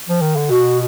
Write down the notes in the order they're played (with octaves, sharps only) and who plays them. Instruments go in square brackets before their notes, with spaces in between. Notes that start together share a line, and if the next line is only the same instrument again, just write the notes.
[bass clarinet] F3
D#3
D3
[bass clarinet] B2 [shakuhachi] F#4